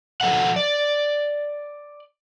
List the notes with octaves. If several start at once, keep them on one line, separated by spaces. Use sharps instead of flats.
F3 A3 A4 E5 F#5
D5